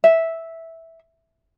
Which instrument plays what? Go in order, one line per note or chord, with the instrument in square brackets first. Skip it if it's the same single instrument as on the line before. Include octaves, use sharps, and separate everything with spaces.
[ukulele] E5